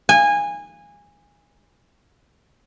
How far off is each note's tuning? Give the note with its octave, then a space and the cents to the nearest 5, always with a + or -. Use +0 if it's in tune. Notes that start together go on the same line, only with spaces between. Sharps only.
G#5 -20